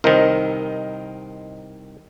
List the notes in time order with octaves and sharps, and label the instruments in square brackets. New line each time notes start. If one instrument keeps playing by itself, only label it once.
[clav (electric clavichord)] C2 D#3 [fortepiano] A#4 C5 D#5